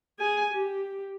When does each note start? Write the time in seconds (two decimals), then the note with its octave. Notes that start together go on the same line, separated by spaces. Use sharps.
0.19 G#4 G#5
0.53 G4